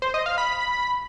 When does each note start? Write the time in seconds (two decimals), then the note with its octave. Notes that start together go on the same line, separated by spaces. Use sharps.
0.02 C5
0.14 D#5
0.26 F5
0.38 B5